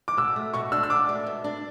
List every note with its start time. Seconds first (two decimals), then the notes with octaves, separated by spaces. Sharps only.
0.08 D6
0.17 B2 E6
0.36 A3
0.54 B2 C#6
0.72 D4 E6
0.83 E6
0.90 B2 D6
1.09 A3
1.26 B2
1.44 D4